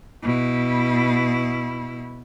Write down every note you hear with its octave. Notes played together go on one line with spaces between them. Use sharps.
B2 E4